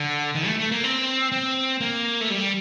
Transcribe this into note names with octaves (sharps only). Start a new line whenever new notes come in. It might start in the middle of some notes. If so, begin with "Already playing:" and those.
Already playing: D3
D#3
A3
A3
A#3
C4
C4
A#3
A3
G3